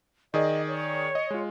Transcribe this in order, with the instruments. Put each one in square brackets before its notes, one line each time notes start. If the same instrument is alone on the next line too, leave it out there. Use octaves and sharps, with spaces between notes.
[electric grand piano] D#3 G#4 D5 [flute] D#5
[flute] C#5
[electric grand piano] D#5
G#3 F4